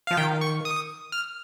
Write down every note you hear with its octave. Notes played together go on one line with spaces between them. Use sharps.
F3 F5
D#3 G5
C#6
D#6
F6